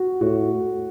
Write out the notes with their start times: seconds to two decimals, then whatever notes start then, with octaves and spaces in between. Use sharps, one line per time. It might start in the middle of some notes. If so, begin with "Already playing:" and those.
Already playing: F#4
0.21 A2 F#4